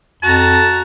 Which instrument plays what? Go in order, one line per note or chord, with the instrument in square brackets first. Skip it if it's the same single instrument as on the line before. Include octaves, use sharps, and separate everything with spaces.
[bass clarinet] F2 [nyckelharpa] F#4 A#5 [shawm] A5